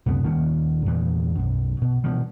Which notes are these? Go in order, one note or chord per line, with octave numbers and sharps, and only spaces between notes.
C#2 F#2 C3 B3
D#1 D#3 A#3 C#4
E2 G2 A#2 E3
B1 F#2
B2
B2 E3 F3 G3